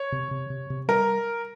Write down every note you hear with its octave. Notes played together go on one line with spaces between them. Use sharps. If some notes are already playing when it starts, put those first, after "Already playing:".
Already playing: C#5
C3
C3
C3
C3
G3 A#4